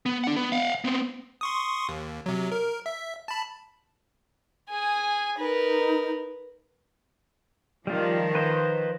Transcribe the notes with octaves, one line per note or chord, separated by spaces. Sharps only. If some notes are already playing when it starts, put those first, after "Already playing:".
B3
D4 F#5
B3
F5 F#5
B3 C4
C6 C#6 D#6
D#2
C3 F#3
A#4
E5
A5 B5
G#4 G#5
D#4 A#4 B4
D#3 F3 G3 F4
B4 C5 D#5